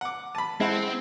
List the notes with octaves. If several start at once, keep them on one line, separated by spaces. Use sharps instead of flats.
F#5 D6
A5 B5
G#3 C4 E4 F#5